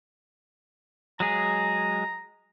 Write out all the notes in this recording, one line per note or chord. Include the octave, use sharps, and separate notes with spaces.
F#3 G#3 G#4 A#5